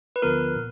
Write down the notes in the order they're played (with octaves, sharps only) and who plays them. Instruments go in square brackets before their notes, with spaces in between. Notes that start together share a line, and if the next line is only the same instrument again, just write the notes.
[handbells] B4
[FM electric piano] D2 D3 F3 B3 F4 [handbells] A#4
[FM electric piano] A#2